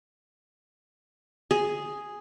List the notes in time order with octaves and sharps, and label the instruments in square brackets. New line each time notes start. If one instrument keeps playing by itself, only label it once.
[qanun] G#4